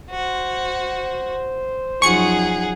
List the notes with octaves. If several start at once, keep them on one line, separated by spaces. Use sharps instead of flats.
F#4 C5
F#2 F3 D#4 G#4 F#5 C#6 C#7